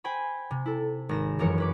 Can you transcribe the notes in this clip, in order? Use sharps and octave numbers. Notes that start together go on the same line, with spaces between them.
C5 G5 G#5 B5
C3
E4 A4
G#1 A#6 E7
F1 F#2 E3 A#4 C#5 C#7
C#4 B4 D6